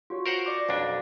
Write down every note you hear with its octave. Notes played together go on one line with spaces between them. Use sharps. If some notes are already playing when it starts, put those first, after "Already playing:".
F4 F#4 C#5
A#4 C5 F#5
D5 D6 A#6
B1 F2 D4